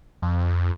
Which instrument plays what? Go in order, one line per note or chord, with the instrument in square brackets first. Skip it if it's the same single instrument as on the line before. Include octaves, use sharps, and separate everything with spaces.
[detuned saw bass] F2